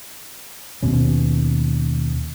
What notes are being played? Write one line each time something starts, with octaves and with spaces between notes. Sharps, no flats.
D#2 B2 C#4